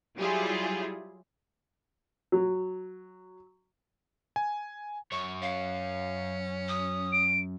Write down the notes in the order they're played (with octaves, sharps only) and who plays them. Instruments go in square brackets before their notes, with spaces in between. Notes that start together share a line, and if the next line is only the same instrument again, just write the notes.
[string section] F#3 G3 E4 F4 G#4
[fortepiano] F#3
[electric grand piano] G#5
[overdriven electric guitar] F#2 C#5 [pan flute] C#6
[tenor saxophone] C#4 [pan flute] F5
[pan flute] D#6
[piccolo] D7